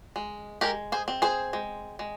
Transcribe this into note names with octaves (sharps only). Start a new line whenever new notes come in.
G#3
G#3 G4 A#4
G#4 C5
C4
G#4 C5
G#3
G#3